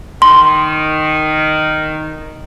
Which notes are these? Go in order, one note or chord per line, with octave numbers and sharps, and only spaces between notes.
D#3 C6